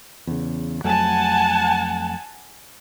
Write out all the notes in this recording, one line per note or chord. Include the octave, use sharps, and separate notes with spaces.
E2 C#3
F2 F#3 A3 F#5 G#5 A5